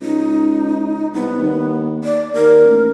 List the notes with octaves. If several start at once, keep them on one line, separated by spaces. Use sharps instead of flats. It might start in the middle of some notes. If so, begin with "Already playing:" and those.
C#2 D#4
C2 B3
D#2
D5
D#2 A#4
A1